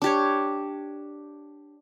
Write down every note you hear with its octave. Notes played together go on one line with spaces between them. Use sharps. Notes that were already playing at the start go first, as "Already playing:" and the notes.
D4 G4 C#5